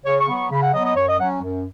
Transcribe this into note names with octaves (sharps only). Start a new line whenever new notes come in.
C#3 C#5
C#6
F#3 B3
C#6
C#3 B5
F#5
F#3 B3 D#5
D#5
F#2 C#5
D#5
F#3 C#4 F#5
F#2